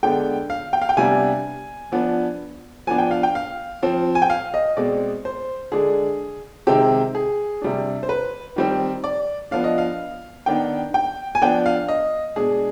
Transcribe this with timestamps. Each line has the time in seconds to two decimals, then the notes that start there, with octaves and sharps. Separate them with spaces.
0.03 D3 G#3 B3 D4 G5
0.50 F5
0.73 G5
0.82 F5
0.89 G5
0.97 C3 G3 B3 D4 G#5
1.92 F3 B3 D4
2.87 F3 B3 D4 G#5
2.98 G5
3.11 F5
3.23 G5
3.35 F5
3.83 F3 C4
4.15 G#5
4.22 G5
4.30 F5
4.54 D#5
4.77 B2 G#3 C4 D5
5.25 C5
5.72 D3 G#3 D4 G#4
6.67 C3 D#3 G#3 C4 G4
7.15 G#4
7.62 C3 G3 D4
8.03 C5
8.09 B4
8.56 D#3 G3 C4
9.04 D5
9.51 F3 B3 D4 F5
9.64 D#5
9.78 F5
10.46 D#3 B3 D4 G5
10.94 G5
11.35 G#5
11.42 F3 B3 D4 G5
11.66 F5
11.88 D#5
12.36 B2 G#3 D4 G#4